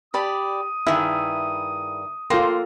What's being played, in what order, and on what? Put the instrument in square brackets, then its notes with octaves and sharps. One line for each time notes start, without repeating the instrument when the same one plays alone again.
[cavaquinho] G4 D5 B5 [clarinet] D#6
[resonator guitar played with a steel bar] G2 D#3 [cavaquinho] E4 G#4 E5
[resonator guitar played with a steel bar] A#3 [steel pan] F4 A4 G5 [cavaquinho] C6